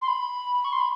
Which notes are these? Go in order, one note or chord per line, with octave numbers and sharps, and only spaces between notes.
C6
B5
C#6
C6
B5